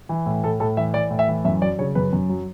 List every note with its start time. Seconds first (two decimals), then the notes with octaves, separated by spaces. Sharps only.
0.09 E3
0.26 A2
0.43 A2 A4
0.60 A2 A4
0.77 E3 E5
0.94 E3 D5
1.10 A2
1.19 E5
1.28 E3
1.45 F#2 E5
1.62 F#3 D5
1.79 C#3 C#5
1.95 F#2 B4
2.13 F#2
2.29 F#3